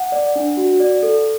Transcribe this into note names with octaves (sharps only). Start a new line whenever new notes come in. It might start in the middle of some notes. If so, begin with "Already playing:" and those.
Already playing: F#5
D5
D4
F#4
D5
A4